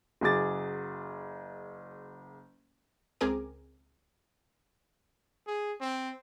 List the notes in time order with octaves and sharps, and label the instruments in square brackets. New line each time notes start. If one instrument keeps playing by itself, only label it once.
[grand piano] F#1 F#3 G#4 G#5 D6 A6
[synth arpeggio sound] C#2 C4 G#4 A#4 D6
[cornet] G#4
C4